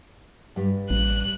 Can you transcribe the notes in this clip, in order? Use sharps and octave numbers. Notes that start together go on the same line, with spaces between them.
G2 G3
A1 F#6